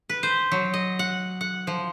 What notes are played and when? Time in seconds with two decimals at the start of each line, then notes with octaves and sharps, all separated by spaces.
0.09 B4
0.23 C5
0.52 F#3
0.74 D#5
0.99 F#5
1.41 F#5
1.67 F3